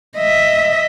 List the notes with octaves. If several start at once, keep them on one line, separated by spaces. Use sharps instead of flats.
D#5 E5